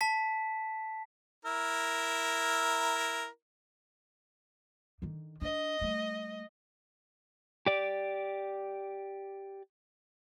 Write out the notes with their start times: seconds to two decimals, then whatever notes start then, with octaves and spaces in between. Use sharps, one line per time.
0.01 A5 B6
1.45 E4 A#4
5.02 D3 D#3
5.42 D4 D#5
5.81 G3 A3
7.66 G4 D5